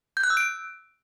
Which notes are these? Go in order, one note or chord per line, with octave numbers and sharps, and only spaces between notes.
G6
F#6
E6
D7